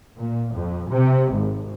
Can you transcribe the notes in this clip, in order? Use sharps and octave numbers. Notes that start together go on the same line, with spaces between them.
A#2
F2
C3
G#1